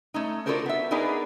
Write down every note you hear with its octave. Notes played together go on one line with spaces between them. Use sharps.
A3 C#4 D#4
D4 F4 F#4 A4 A#4 C5
B3 E5
B3 D4 D#4 G#4 A#4 B4